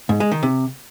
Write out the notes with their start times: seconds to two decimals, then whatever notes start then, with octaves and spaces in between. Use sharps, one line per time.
0.09 G#2
0.20 G#3
0.31 D#3
0.43 C3